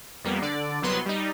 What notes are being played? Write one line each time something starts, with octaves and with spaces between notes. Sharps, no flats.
F2 G3 A#3 B3
D3 D5
C2 F#3 B3 B4 C6
G3 D#4